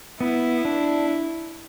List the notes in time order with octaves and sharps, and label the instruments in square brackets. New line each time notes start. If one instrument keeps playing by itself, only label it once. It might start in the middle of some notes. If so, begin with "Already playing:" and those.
[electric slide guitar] B3 [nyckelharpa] E4
[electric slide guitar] D4